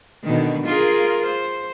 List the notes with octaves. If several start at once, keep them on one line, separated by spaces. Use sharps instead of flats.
B2 D3 D#3
F4 G#4 A#4
C5